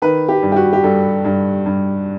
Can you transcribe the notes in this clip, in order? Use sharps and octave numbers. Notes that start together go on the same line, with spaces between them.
D#3 B4
G4
G2
G4
F#4
G4
G2 A4
G2
G2